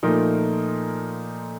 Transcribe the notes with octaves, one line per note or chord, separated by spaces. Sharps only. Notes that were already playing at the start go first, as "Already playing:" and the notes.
A#2 F3 A3 D#4 A#4